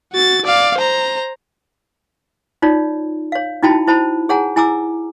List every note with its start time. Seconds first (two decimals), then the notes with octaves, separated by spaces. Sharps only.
0.13 F#4 A6
0.45 D5 F5
0.78 C5 A#5
2.62 D#4 F4 C#5 D5
3.32 C#5 F5
3.63 D#4 E4 F#4 G5 A5 B5
3.87 E4 C5 A5 B5
4.29 G#4 C#5 F#5 G#5 A#5
4.56 E4 G#5 A#5 D6 E6